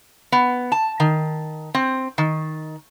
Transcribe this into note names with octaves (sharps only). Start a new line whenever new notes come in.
B3
A5
D#3
C4
D#3